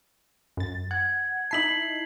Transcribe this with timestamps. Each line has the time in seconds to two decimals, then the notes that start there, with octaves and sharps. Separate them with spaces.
0.57 F#2 A6
0.91 F#5 G#6
1.51 D#4 E4 A5 B6 C7 F#7